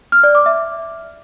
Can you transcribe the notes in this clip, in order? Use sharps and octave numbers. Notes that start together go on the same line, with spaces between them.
F6
D5
D6
E5